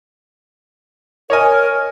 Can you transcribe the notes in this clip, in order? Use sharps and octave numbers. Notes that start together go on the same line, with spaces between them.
A#4 C#5 D#5 G#5